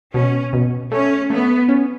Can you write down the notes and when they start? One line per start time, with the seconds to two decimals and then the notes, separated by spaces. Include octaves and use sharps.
0.14 B2 C#4
0.53 B2
0.91 A3 C#4
1.30 A3 B3
1.69 C#4